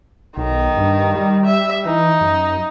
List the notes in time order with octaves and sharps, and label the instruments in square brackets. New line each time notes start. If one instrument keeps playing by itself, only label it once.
[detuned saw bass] B1 [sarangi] D#3
[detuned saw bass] G2
G3
[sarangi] E5
[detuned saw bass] E3 [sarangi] D#4
[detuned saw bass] F#2